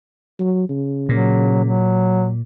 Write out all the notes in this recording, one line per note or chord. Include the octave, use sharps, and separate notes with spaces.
F#3
C#3
A#2 F#3
F#3